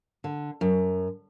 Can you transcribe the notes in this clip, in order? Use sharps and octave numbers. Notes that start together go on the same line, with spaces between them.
D3
F#2